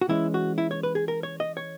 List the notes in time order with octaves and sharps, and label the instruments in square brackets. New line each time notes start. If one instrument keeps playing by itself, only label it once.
[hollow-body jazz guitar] F#4
E3 G#3 C#4 E4
F#4
E4
C#5
B4
G#4
A#4
C#5
D#5
C#5